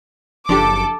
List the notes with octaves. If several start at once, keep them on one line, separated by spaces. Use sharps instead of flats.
F#1 F3 D4 G4 A4 D6